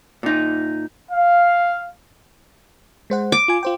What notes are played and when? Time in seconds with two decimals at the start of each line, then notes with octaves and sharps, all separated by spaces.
0.23 A#2 D#4
1.11 F5
3.10 G#3 C5 F#5
3.32 D6
3.48 F4 G#5
3.63 F4 C5 G5